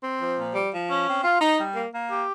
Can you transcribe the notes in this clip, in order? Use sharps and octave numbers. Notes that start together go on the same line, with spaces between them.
C4
F3
A#2
G3
F3
C#4
C4
F4
D#4
G3
A#3
A#3
G4